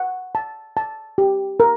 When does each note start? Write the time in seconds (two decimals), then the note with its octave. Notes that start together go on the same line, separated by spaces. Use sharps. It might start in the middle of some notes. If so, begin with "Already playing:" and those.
Already playing: F#5
0.35 A5
0.77 A5
1.18 G4
1.60 A#4